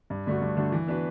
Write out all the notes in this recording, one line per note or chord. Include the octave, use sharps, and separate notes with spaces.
G2
D3 A3 D4 F#4
G2
D3 A3 D4 F#4
E3
B3 D4 F#4 B4